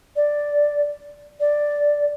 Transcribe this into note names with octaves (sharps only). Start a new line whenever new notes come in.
D5
D5